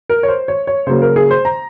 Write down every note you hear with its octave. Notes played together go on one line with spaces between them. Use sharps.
A#4
C#5
C5
C#5
C#5
C#3 F#3 A#3 C5
A#4
G#4
C5
A#5